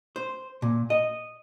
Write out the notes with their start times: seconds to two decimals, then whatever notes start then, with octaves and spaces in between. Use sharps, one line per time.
0.16 C5
0.62 A#2
0.90 D#5